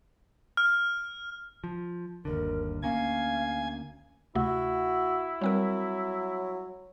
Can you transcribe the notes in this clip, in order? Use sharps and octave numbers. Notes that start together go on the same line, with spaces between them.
F6
F3
G1 D#2 D3 A#4
D2 A#3 C#4 F5 G#5 G#6
D2 C3 A3 E4 F#4
F#3 G3 C4 A#4